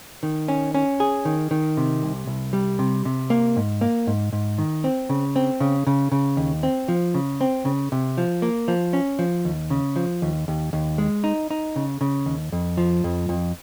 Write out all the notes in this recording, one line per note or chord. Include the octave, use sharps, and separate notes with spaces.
D#3
C#4
C#4
G#4
D#3
D#3
C3
C2
C2
G3
C3
C3
A#3
G#2
A#3
G#2
G#2
D#3
C4
C#3
C4
C#3
C#3
C#3
D#2
C4
F3
C#3
C4
C#3
C3
F3
A#3
F3
C#4
F3
D#2
C#3
F3
D#2
D#2
D#2
G#3
D#4
D#4
C#3
C#3
D#2
F2
F3
F2
F2